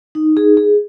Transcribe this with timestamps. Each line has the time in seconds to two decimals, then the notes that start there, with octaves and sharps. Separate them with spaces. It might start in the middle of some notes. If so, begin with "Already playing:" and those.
0.15 D#4
0.37 G#4
0.57 G#4